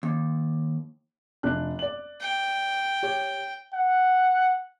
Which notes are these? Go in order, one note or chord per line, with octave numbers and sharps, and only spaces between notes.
D#2
F1 D4 F#6
D5 F#7
G5
G4 C#5
F#5